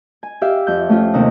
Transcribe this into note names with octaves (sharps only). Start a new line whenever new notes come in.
G#5
G4 E5 F5
F2 G6
A3 C#4 F4
D#2 C3 D#4